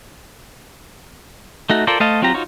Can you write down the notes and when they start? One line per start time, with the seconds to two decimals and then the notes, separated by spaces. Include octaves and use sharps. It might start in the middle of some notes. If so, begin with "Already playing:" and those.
1.70 A3 D#4 F#4
1.87 F4 A4 A#4 C5 D5
2.00 A3 C5 D#5 F5 A5
2.22 F#3 C4 F4 G4 A#5
2.34 D#4 F4 F#4 C5 C#5